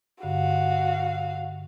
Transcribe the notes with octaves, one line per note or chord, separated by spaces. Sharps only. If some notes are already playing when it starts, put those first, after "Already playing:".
G2 D3 F#4 F5